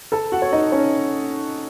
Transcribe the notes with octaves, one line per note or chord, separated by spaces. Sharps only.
A4 A5
F#4 F#5
C#5
D#4 D#5
C#4 C#5